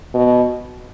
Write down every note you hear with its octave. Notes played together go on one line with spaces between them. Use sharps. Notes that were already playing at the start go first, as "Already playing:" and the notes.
B2